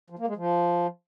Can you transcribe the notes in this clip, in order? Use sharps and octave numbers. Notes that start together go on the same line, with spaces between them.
F3
A#3
G#3
F3